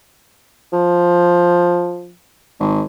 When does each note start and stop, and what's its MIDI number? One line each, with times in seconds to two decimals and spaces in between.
0.73 2.12 53
2.60 2.83 32